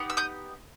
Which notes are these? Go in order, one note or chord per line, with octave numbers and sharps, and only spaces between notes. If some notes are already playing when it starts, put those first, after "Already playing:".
Already playing: B3 D#4 G4
E6
D#6 G6